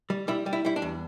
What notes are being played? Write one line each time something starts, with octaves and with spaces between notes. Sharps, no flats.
G3
G3 E4
G3
E4
G3 E4
D4
E2